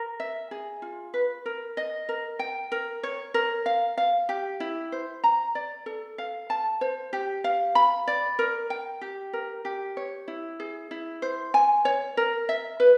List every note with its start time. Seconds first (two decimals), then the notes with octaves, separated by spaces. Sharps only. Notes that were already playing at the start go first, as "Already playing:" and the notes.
Already playing: A#4
0.20 E5
0.51 G#4
0.82 F4
1.14 B4
1.46 A#4
1.77 D#5
2.09 A#4
2.39 G5
2.72 A#4
3.03 C#5
3.34 A#4
3.66 F5
3.98 F5
4.29 G4
4.60 E4
4.92 C5
5.24 A#5
5.55 D5
5.86 A4
6.18 F5
6.50 A5
6.81 C5
7.13 G4
7.44 F5
7.75 B5
8.07 D5
8.39 A#4
8.70 G5
9.01 G4
9.33 A#4
9.65 G4
9.97 C#5
10.28 E4
10.60 G#4
10.91 E4
11.22 C5
11.54 G#5
11.85 C#5
12.17 A#4
12.49 E5
12.80 B4